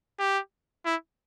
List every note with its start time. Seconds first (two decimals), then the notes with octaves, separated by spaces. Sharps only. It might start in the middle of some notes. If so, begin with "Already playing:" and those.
0.19 G4
0.85 E4